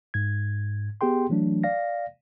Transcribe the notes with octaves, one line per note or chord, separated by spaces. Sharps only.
G#2 G#6
B3 G4 G#4 G5 C6
E3 F#3 A3 D4
D5 F5 A#6